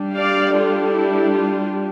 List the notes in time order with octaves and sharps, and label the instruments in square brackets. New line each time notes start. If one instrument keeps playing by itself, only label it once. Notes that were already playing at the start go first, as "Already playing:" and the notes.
Already playing: [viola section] G3 D4
D5 F5
F4 A4
E4
F4